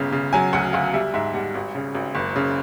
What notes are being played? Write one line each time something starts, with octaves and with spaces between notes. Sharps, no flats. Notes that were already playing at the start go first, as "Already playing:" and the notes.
Already playing: G1 C#3
C#3
F#3 G#5
D2 F#5
D2 F5
G3 E5
G#2 E5
G3 F#5
G#1
C#3
G#1
F#1
C#3